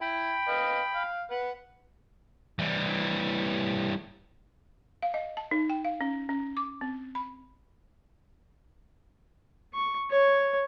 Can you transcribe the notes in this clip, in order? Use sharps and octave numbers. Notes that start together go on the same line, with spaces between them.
E4 G5 B5
B4 D#5 F5
F5
B4 F#5
E3 G3
F5
D#5
A5
D#4
G5
F5
C#4
C#4
D6
C4
B5
C#6
C#5